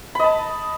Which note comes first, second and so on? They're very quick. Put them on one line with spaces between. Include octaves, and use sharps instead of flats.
B5 D#5 A5